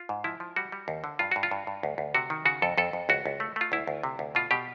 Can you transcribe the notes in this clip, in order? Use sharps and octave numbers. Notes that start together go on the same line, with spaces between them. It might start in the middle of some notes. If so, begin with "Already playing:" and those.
Already playing: F4
G#2
F3 E4
F3
G3 F#4
G3
D#2
D3
G2 F4
G2 F#4
F4
G2
G2
D2
D2
C3 F#4
D#3
C#3 F#4
F2 A4
F2 A4
F2
C#2 F#4
C#2
A3
A3 F4
D2 E4
D2
C3
D2
B2 F4
B2 G4